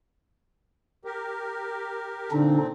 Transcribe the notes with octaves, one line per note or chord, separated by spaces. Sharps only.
G4 A#4
A#2 D3 C4 D4 D#4